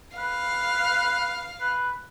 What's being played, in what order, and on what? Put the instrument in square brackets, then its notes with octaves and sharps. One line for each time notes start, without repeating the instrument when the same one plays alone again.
[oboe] B4 [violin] F5
[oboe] B4